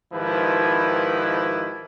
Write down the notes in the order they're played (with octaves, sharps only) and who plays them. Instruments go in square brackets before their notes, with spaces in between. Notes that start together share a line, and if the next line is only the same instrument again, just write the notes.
[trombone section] G#2 D#3 F3 E4 G4 B4